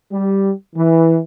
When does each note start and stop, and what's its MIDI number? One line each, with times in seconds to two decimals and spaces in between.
0.12 0.52 55
0.76 1.19 52